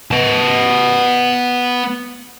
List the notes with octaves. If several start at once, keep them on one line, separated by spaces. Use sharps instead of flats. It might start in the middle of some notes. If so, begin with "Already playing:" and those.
B3 A5